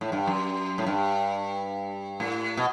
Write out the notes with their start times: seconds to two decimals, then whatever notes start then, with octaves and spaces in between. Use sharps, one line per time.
0.01 A2
0.12 G2
0.27 F#2
0.78 A2
0.87 G2
2.20 A2
2.57 B2